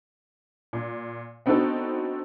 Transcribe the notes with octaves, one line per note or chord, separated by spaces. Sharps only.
A#2
B3 C4 D4 D#4 F#4 A4